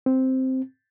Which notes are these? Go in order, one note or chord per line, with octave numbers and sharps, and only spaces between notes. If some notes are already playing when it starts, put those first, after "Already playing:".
C4